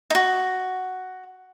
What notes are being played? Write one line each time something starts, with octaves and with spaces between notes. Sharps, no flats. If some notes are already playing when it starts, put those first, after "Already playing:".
D#4 F#4